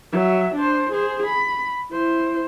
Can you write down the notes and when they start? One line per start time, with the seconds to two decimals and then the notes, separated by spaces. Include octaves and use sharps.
0.12 F#3 E5
0.55 D4 C5
0.92 G#4 C5
1.26 B5
1.92 E4 C5